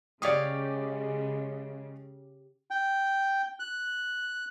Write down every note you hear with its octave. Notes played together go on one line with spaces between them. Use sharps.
C#3 G#3 G4 C#5 D5 F5 D#6
G5
F#6